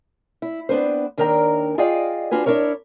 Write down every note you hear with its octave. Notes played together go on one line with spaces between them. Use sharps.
E4
B3 C4 D4 B4 C5
D#2 D#3 D4 A#4 G5 A#5
F4 G#4 D5 D#5 F5 G5
D4 F4 F#4 B4 G#5
D4 E4 A#4 C#5